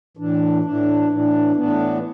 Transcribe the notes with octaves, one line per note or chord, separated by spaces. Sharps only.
A2 E3 D4
A2 E3 D4
A2 E3 D4
A2 E3 B3 D4